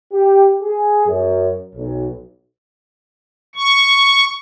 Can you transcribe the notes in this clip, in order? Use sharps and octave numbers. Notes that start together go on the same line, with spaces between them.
G4
G#4
F#2
B1
C#6